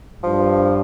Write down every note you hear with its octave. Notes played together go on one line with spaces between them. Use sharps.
G2 F3